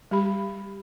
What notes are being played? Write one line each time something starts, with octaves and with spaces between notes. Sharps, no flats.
G3 G4 B5